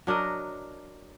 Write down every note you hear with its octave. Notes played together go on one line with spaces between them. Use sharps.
F#3 D4 A#4 D#5